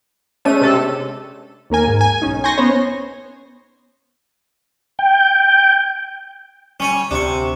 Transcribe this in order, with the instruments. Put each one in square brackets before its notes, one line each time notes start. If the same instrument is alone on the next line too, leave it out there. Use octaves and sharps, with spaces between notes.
[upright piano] G#3 C#4 D4 [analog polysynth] A3 D#7
[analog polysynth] C3 A4
[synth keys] D#2 A#3 A#4 G#5
G#2
G#5
B1 C#4 D#4
G#5 C6 C#6 G6 A#6
B3 C#4 C5 C#5
[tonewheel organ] G5
[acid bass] G3 [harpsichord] C#4 C#5 G#5
[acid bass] D2 [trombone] C3 [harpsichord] D4 C#6